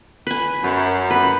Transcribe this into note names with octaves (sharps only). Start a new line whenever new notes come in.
B4 G#5
F#2
B4